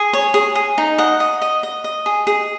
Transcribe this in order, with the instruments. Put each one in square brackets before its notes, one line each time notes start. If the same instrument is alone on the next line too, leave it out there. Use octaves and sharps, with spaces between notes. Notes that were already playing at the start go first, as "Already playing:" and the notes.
Already playing: [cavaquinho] G#4 G#5
C#5
G#4
G#4
D#4
D#5 F#5
D#5
D#5
D#5
D#5
G#4
G#4